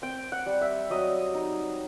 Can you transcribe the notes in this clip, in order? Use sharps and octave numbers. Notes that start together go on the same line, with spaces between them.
C4 G5
F#5
G3
E5
F#3 D#5
D#4